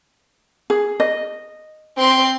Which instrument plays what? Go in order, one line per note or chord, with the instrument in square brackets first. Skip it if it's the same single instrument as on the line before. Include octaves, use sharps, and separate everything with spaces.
[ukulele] G#4
D#5
[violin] C4 C6